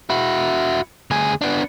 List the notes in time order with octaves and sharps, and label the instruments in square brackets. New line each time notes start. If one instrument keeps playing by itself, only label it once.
[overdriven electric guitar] E4 F#4
D2 G#4
B3 D4